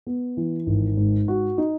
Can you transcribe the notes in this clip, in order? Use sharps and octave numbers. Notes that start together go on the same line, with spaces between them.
B3
E3
G#1
G#2
F#4
D#4